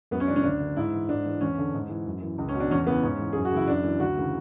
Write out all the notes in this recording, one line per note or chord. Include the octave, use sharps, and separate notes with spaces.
F#2 B3
C#4
C#3 E3 D4
C#4
D2 D4
D3
G#2 E4
E3
G#2 D4
E3
E2 C#4
D3
G#2
E3
F#2
E3
C#2
C#4
B2
D4
E2 C#4
C#3 E3 B3
G#2 C#4
E3
F#2 G#4
F#4
C#3 E3 E4
F#2 D4
E3
D2 F#4
C#3 E3